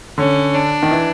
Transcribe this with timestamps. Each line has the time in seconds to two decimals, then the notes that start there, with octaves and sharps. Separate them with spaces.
0.18 D3 C#4
0.55 D4
0.83 D#3
0.91 E3